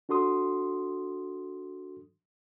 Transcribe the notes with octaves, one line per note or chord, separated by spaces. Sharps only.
D4 F#4 A4 C6 D#6